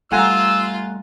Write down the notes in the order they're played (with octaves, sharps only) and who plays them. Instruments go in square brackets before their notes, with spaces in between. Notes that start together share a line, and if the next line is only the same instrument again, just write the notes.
[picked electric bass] G3 A3 [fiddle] F4 [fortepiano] F#5 G#5 A#5 [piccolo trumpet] E6